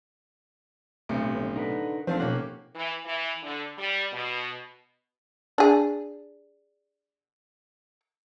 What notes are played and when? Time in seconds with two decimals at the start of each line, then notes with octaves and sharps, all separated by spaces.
1.09 D1 B1 A2 C3
1.34 G1
1.56 D3 D#4 A#4 B4
2.07 F1 F3 C4 D4 F4 A4
2.20 B2 A#3 C#4 G4 F#5
2.76 E3
3.06 E3
3.44 D3
3.78 G3
4.13 B2
5.58 D4 G#4